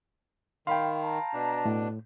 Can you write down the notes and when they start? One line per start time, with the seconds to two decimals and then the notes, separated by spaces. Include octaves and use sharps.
0.67 D#3 F5 G5 B5 C6
1.03 A5 A#5
1.34 B2 D4
1.65 A2